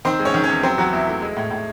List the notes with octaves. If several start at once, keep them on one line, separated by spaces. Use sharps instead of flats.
D#3 C4 C5
G#3
C#4 C#5
D#3
C#4 C#5
E2
F#3 C4 C5
E2 F#3 F#4
E2 E4
A3 E4
G#3
A2
A2